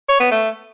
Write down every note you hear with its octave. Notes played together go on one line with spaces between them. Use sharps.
C#5
B3
A3